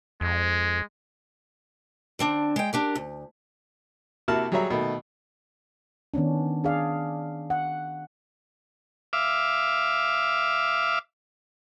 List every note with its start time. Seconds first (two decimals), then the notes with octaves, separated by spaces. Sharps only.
0.21 F2 G#3
2.19 D3 C4 D4
2.56 G#3 G5
2.73 D4 G4 A#4
2.95 D2
4.28 C3 A#3 E4 F#4 A5 F6
4.52 F#3 G3 G#4 C#5 E5 A#5
4.70 B2 D#3 A3
6.14 D#3 B3 C#4 D4
6.64 D4 G#4 D5 F5
7.50 F#5
9.13 E5 F5 D6